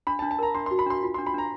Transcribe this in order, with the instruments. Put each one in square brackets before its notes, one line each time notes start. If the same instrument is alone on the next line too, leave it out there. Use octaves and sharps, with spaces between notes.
[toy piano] D4 [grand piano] B5
[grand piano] A5
[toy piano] D4
[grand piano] A5
[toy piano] A#4 [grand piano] A#5
[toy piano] D4 [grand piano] C6
[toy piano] F#4 [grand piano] C6
[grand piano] B5
[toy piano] D4 [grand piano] C6
[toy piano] F4
[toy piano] D4 [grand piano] C6
[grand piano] B5
[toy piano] D4 [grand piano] A#5